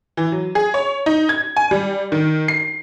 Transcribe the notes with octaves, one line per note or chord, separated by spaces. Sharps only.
E3
F#3
G#4
C#5
D#4
G#6
G#5
G3
D#3
C7